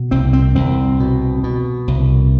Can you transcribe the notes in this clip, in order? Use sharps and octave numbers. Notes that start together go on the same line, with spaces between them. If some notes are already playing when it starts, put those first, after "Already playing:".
Already playing: B2
C2 C4
C4
C2 C4
B2
B2
C2